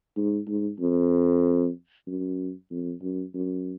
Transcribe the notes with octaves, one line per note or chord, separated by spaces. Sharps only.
G#2
G#2
F2
F#2
F2
F#2
F#2